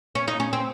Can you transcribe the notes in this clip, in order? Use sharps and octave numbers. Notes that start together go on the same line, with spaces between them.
C#4
D#4
C#4
C4